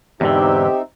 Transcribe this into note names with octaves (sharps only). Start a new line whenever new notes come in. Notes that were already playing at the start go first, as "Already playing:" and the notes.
E2 G#2 D3 C4 D#4 G4 E5